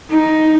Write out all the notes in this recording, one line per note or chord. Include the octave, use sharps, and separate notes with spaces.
D#4